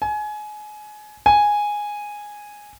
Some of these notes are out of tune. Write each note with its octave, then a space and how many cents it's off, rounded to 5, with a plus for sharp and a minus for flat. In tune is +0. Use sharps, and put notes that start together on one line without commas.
G#5 +25
G#5 -5